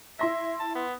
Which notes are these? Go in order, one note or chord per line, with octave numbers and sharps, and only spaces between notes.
E4 E5 C6 A#6
A5
B3